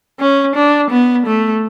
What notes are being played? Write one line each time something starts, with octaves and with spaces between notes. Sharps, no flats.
C#4
D4
B3
A3